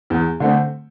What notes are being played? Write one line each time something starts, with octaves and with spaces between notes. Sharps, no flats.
E2
D3 A3 C4